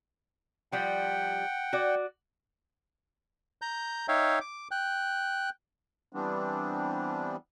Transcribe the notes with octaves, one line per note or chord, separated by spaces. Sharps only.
F3 G3 F#5 G5
F#4 D5
A#5 G6
D#4 C#5 E5 F5 G5
D6
G5 F#6
E3 G3 B3 C4 D4